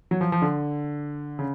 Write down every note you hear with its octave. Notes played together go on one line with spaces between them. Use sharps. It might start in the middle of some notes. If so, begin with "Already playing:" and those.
F#3
F3
F3
D3
C#3